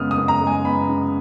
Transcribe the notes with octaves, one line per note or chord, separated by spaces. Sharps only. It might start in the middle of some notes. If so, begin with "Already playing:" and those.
Already playing: F#2 C#3 G#3 B3 D#6 F6
D#6
F#2
A#5
G#3
G#5
B3 B5
C#3